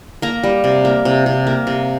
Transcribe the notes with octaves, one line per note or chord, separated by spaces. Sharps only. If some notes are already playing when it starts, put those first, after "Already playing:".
A#3 A#5
G3
C3
A#3
C3
C3
A#3
C3